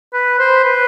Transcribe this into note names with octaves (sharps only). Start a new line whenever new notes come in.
B4
C5
B4